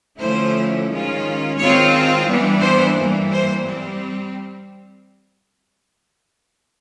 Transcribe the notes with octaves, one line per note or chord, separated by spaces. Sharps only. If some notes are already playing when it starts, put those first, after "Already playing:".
D3 F3 A3 C#4 E4 C5
D#3 G#3 C#4 F4
D#3 G#3 C4 F4 C#5
E3 G3 B3 D4
C5
G2 E3 G3 A#3
C5
G3 C4